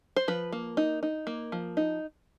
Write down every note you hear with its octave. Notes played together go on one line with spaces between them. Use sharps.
C5
F3 B4
A#3
D#4
D#4
A#3
F3
D#4